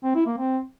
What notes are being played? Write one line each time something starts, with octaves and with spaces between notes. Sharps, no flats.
C4
E4
A#3
C4